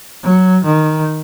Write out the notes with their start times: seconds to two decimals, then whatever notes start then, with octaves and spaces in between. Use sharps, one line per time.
0.24 F#3
0.65 D#3